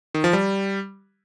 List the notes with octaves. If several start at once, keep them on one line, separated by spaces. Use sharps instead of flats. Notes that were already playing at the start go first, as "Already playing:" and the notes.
D#3
F3
G3